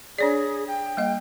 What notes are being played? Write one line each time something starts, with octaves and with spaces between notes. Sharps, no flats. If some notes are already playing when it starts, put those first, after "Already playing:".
D4 G#4 C#5 D5
G5
G3 A#3 D#5